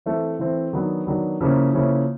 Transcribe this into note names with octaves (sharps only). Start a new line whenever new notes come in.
E3 A3 C4
E3 A3 C4
D#3 F#3 B3 D4
D#3 F#3 B3 D4
C#3 F3 A#3 C#4 E4
C#3 F3 A#3 C#4 E4